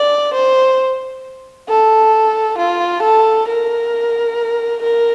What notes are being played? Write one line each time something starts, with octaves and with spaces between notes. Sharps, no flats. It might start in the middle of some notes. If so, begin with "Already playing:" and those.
Already playing: D5
C5
A4
F4
A4
A#4
A#4